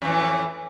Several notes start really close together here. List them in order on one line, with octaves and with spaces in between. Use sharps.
F2 E3 A2